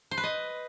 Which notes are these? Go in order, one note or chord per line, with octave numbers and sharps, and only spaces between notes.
C5
B4
D#5